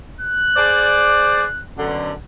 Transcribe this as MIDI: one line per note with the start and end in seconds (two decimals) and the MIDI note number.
0.21 1.63 90
0.56 1.43 68
0.56 1.43 72
0.56 1.43 74
1.78 2.11 42
1.78 2.11 47
1.78 2.11 50